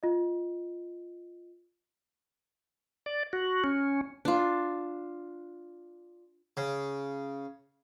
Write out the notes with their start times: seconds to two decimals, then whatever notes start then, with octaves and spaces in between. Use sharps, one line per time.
0.03 F4 D#5
3.06 D5
3.33 F#4
3.64 C#4
4.25 D4 F4
6.57 C#3